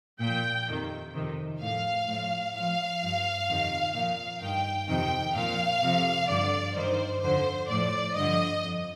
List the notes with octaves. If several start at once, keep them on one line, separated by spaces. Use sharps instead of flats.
A#2 F3 G5
F2 C3 D#3
F2 C3 D#3
A2 F3 F5
A2 F3
A2 F3 F5
G2 F3
F2 C3 D#3
A#2 F3 F5
G2 D#3 G5
F2 C3 D#3 G5
A#2 F3 F5
F2 C3 F3
G2 D3 F3 D5
G2 D#3 C5
F2 D3 F3 C5
A2 F3 D5
G2 D3 F3 D#5
F2